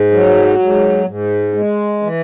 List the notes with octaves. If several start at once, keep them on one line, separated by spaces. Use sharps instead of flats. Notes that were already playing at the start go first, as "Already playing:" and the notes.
Already playing: G#2
F#3
G#2
G#2
G#3
E3